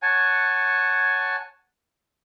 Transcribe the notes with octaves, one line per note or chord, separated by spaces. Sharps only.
C#5 F#5 G#5 A5